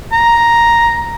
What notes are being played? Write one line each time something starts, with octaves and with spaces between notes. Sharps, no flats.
A#5